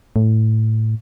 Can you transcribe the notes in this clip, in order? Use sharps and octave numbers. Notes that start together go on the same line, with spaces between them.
A2